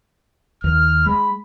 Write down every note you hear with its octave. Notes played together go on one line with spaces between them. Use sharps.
D#2 F6
G#3 B5